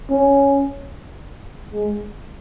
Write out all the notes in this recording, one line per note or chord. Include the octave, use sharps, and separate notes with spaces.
C#4
G#3